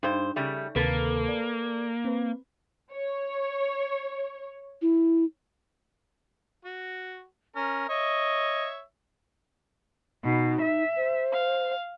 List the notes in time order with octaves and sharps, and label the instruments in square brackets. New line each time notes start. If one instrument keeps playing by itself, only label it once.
[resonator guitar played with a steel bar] G2 C5 [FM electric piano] D#4
[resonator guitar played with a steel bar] C#3 G3 A3
[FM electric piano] D2 C3 D#3 [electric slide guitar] A#3 [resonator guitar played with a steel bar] A4 B4
[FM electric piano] D5
C4 B4
[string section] C#5
[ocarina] E4
[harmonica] F#4
[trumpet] C#4 [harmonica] A#4
[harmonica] C#5 E5 [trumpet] D#5
[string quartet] B2 [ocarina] D#4
[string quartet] E5
[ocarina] C5
[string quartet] F5